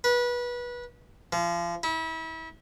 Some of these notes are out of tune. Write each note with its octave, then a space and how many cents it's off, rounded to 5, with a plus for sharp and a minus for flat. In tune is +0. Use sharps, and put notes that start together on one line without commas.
B4 -25
F3 -30
E4 -35